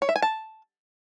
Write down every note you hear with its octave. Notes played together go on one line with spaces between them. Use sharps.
C#5
E5
G#5
A5